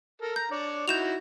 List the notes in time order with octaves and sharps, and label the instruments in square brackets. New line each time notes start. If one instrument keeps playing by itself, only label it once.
[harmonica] A4 A#4
[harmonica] A#5 [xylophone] G6
[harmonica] D4 C#5 D5
[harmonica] D#4 E4 F#4 [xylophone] G6 E7 F7